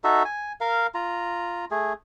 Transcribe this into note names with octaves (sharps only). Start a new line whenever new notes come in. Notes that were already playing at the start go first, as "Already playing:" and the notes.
D#4 F#4 A4 E5
G#5
A#4 F5
F4 A#5
A3 G#4